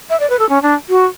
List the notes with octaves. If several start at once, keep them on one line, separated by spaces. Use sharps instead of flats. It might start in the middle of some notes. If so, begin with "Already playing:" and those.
E5
D5
B4
A4
C#4
D4
F#4